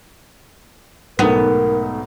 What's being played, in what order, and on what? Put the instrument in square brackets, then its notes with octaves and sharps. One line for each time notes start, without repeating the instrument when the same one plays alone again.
[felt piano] B1 G#2 A3 [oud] B3 [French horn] A#4